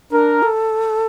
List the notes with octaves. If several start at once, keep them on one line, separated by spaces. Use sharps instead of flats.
D4 A#4
A4